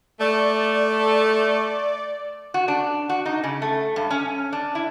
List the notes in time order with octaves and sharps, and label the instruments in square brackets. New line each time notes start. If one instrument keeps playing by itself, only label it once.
[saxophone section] A3 [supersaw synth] D5
[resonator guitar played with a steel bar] F#4
D4
F#4
D#4
C#3
A3
G2
C#4
D4
E4